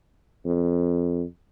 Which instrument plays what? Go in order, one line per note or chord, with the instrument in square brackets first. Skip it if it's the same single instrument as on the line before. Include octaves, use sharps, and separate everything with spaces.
[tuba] F2